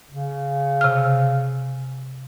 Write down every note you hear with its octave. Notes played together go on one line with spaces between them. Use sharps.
C#3
C3 F6